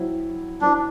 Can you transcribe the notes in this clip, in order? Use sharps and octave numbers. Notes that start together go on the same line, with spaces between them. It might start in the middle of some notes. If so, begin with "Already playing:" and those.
Already playing: F#3 C4 E4
F#3 C4 D4 E4